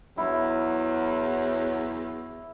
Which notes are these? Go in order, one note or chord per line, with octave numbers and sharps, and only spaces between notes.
E2 F#3 E4